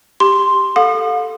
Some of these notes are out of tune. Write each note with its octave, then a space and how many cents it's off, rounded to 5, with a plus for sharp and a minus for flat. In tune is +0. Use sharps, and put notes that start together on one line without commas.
G4 +0 C6 +0
A4 +0 F5 +40 D#6 -40